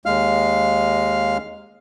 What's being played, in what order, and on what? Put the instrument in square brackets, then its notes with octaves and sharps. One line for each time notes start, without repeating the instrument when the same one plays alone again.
[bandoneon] D#2 G#3 F5 F6